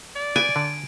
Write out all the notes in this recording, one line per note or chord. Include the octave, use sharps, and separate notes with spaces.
D5
B3 G#5 D7
D3